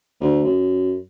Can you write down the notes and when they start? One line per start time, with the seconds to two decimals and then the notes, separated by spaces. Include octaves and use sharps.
0.20 D2
0.45 F#2